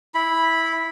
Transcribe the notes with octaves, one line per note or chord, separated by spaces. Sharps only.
E4 B5